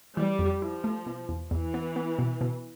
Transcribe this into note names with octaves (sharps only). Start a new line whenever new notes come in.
E3 G3
F2
F3 E4
A3
B2
E2
E2 E3
B3
B3
B2
B2